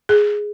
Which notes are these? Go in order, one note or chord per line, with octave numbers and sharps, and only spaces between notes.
G#4